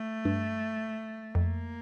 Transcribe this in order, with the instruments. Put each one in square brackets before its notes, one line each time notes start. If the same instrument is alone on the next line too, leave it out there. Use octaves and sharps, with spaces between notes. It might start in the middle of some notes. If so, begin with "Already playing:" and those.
Already playing: [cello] A3
[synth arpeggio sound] G2
[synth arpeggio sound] F2 [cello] A#3